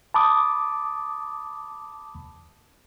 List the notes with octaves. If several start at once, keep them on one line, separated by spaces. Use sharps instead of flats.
A5 B5 D6 D#6